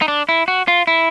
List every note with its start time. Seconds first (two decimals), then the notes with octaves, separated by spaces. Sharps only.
0.02 D#4
0.08 D4
0.29 E4
0.48 F#4
0.68 F4
0.87 E4